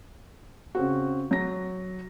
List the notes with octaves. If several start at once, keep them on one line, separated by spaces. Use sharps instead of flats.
C#3 C4 F#4
F#3 A#6